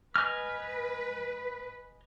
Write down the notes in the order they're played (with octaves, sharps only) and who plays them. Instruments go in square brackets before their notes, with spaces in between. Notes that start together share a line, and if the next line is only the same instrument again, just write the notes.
[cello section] B4 [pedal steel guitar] D#5 G#5 F6